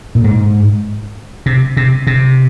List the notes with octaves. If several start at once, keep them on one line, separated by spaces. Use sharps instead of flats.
A#2
G#2
C3
C3
C3